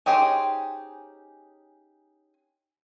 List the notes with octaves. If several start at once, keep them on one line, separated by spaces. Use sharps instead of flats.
C#4 D#4 G4 G#4 C5